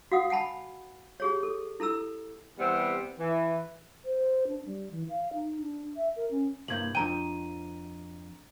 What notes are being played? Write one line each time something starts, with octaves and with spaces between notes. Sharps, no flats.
F#4 F5 F#5 D#6
F#5 G#5 A5 B5
G4 G#4 C#5
A4
E4 A4 A#5 E6
C3 E3 G3 B3 C4
E3
C5
D4
G3
E3
F5
D#4
D4
E5
A#4
C#4
C2 G2 A#3 G6 G#6 F#7
F2 C#3 D4 G5 A#5 D#7